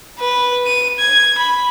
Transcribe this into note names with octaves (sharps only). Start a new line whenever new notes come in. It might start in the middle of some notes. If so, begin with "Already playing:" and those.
B4
D#7
G#6
B5